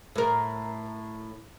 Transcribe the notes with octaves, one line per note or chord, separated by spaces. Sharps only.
A2 A#4